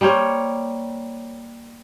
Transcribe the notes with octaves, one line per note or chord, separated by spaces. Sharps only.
G3 A#3 C5 C#5